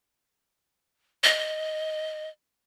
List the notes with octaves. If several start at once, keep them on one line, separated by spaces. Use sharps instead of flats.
D#5